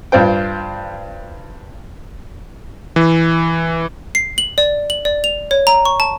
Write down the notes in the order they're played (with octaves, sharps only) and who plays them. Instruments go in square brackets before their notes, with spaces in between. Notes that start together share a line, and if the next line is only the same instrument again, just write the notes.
[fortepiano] G2 F4 C5 G5
[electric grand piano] E3
[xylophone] C7
F#7
D5
F#7
D5
F7
C#5
A#5
C#6
A5